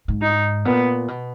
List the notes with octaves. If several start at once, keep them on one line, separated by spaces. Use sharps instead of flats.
G#2
D#4
A#2 B3
B2